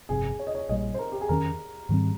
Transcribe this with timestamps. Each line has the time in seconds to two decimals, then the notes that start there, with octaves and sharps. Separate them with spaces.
0.09 G1 F2 C3 G#4
0.39 C#5
0.47 D#5
0.55 C#5
0.69 A#1 A#2 G3 D#5
0.94 C5
0.99 A#4
1.12 G4
1.21 G#4
1.29 F2 D#3 A#3 C#4 A#4
1.89 G#2 D#3 G3 C4